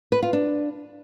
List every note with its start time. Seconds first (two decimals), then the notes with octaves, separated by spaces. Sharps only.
0.12 B4
0.22 F4
0.33 D4